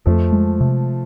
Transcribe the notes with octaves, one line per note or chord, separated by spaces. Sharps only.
F2 F3 A3
G#3
C3